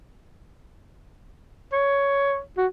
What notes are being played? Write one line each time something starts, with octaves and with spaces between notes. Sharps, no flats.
C#5
F#4